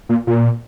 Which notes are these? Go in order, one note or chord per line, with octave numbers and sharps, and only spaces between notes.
A#2
A#2